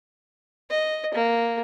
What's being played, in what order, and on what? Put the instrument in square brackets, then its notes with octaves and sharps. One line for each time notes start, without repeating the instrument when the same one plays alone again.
[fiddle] D#5
A#3